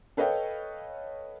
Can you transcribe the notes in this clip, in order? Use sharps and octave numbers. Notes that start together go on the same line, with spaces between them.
A4 B4 C#5 D#5 F5 G5